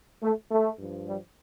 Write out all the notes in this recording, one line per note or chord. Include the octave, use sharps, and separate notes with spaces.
A3
A3
G2 F3
G3